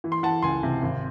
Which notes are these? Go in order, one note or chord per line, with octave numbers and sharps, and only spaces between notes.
E3
C6
E3 F#5 A5
C#2 G#5 C6
C3
G#1